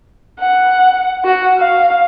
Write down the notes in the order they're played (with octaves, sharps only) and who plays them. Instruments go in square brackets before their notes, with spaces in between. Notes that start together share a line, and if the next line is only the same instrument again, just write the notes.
[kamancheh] F#5
F#4
F5